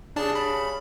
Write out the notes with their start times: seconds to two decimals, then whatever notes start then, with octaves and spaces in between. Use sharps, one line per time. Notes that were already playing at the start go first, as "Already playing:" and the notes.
0.16 G2 C#3 D4 D5 A5
0.35 B5